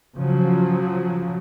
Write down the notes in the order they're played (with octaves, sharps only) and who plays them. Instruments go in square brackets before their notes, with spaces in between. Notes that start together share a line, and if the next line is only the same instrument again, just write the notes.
[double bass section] C#3 F3 F#3